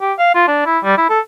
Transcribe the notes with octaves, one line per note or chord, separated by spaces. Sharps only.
G4
F5
F4
D4
E4
G3
E4
A4